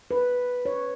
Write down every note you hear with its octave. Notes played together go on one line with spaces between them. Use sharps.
B4
C#5